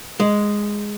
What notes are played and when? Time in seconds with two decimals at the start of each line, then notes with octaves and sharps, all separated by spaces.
0.20 G#3